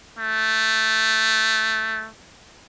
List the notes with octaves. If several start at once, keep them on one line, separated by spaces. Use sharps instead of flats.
A3